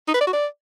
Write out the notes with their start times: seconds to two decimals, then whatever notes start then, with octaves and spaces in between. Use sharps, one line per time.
0.08 D#4
0.14 B4
0.20 D5
0.27 F#4
0.33 D5